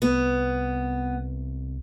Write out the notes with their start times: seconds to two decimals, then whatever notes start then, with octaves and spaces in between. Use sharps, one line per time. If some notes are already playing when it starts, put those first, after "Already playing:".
0.02 C2 B3